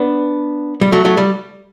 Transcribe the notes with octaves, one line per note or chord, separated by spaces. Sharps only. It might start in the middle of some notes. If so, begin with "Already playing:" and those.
Already playing: B3 D4
G3
F#3 A3
F#3 A3
G3